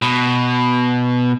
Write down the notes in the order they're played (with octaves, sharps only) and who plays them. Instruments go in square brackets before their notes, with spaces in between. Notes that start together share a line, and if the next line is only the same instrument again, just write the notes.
[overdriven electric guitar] B2